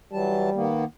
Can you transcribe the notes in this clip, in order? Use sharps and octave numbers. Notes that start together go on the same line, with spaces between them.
E3 F#3 G3 A5
D#3 A#3 B3